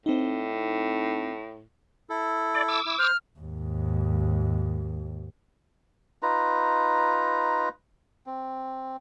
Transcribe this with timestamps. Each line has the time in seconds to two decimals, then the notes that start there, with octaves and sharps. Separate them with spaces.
0.06 A2 C4 D#4
2.10 E4 A4
2.55 D5
2.68 D6 E6
2.86 E4
2.98 C5 F6
3.39 D#2 G#2
6.23 D#4 F4 B4 A#5
8.26 C4